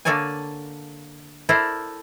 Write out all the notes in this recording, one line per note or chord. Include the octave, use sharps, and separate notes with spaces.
D3 A#3 A4 C#5 D5 G#5
E4 A4 A#4 C5 D5